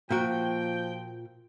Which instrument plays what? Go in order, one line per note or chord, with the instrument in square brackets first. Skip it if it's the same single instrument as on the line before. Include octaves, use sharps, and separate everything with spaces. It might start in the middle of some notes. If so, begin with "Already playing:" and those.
[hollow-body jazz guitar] A#2 F#4 [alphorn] F3 [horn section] G5